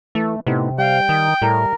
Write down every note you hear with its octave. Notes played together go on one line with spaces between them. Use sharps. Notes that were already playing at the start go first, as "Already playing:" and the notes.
E3 A3
A2 C3 B3 D#4
G3 F5 G5
D#3 D#6
A2 G3 G4 A#4